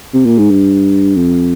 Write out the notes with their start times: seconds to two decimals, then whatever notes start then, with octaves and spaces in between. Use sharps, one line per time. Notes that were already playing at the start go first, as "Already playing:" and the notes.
0.14 C3
0.26 A#2
0.38 G#2
0.50 G2
1.16 F2